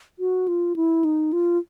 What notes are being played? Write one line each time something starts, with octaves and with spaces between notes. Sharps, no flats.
F#4
F4
E4
D#4
F4